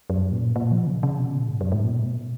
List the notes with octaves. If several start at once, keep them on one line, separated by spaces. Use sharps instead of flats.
F#2
A#2
A#2
F3
C#3
C#3
B2
A#2
G#2
F#2
G#2
A#2
B2
A#2
B2